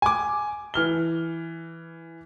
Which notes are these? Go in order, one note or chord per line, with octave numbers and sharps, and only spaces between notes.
G#5 D6
E3 F6 G7